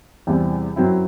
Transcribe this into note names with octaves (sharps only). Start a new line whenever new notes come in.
E2 C3 E3 G3 C4
F#2 F#3 C4 E4